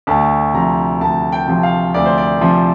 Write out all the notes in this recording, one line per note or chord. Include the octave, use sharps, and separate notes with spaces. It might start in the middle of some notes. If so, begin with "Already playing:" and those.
D2 A5
C3 F3 A#5
D2 A5
G5
C3 F3
F5
D2 D5
C5
D5
C3 F3